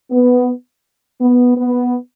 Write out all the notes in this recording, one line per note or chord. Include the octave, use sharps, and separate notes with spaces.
B3
B3
B3